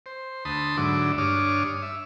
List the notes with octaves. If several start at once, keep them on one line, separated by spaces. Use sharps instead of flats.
C5
D2 A5 B5 C6 D#6
D2 G#2 D3 F#3 E5 D6
G2 D4 C#5 D6 D#6 F6
E5